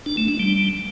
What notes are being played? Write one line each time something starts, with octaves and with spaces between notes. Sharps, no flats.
D4
A3
D4
G3